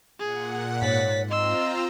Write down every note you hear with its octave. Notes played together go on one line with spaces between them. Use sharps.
A#2 G#4 F#5
G#2 C#5 A6 B6
C4 F4 D#5 A#5 C6 E6